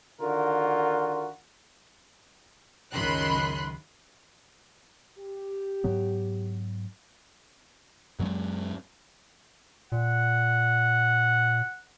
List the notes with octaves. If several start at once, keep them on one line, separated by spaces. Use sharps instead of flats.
D3 D#3 F4 F#4 A#4
C#2 F#2 D#3 B5 C6 F#6
G4
G#2 F#3 B3
F#2 F#3 G#3
A#2 F#5